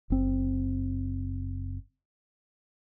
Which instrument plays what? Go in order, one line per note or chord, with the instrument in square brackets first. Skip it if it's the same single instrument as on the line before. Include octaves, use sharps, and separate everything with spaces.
[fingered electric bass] F#1 C4